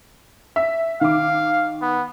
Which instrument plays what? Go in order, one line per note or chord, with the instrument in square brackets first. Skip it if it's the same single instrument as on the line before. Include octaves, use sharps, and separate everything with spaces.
[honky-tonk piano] E5
[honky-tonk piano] D#3 D6 [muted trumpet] F5
[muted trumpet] B3